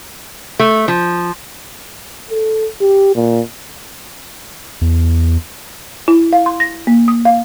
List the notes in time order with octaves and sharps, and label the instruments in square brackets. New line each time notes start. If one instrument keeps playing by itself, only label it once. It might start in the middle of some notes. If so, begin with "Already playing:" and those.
[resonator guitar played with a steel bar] A3
F3
[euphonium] A4
G4
A#2
[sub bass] E2
[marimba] E4
F5
C6
A#6
A#3
D#6
F5